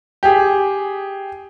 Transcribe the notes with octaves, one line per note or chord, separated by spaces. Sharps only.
G4 G#4